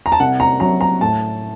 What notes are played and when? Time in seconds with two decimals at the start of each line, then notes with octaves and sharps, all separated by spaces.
0.06 A#5
0.12 A5
0.20 C2 F#5
0.40 A#5
0.60 C3 F#3 A#5
0.81 A#5
1.01 A2 A5